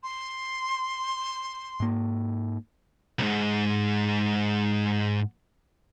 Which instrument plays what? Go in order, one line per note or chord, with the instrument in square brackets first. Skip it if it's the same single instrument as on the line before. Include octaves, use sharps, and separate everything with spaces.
[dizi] C6
[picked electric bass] G#2 A#3
[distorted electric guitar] C2 G#2